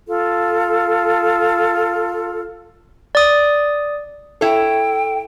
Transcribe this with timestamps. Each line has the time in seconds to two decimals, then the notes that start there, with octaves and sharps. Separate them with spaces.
0.08 F4 A4
3.15 D5 D#6
4.41 E4 A4 C#5 G5